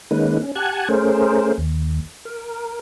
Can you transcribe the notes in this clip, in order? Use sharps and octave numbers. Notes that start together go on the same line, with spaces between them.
D#3 G#3 A#3 C#4 D#4 B4
C#4
G4 F#5 G#5 A5 F#6 G#6
A3 C#4 G#4 A#4 C5
D#2
A#4